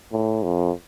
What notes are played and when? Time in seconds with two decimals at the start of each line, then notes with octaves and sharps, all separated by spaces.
0.12 A2
0.43 F2